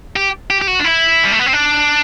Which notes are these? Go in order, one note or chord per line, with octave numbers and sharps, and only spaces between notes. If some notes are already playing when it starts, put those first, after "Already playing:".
G4
G4
G4
F#4
D4
E4
G3
A3
B3
C4
D4